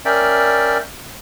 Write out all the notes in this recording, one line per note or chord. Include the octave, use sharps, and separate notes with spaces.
C#4 A#4 D5 E5 G5